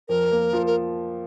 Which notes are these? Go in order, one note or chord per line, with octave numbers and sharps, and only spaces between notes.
F2 A#4
A#3
F3
A#4